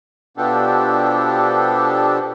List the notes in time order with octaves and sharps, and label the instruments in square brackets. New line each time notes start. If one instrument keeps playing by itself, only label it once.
[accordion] B2 F3 B3 D4 G4 A4